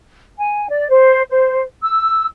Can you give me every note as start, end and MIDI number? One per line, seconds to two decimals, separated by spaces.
0.38 0.69 80
0.69 0.87 74
0.88 1.23 72
1.29 1.61 72
1.82 2.26 88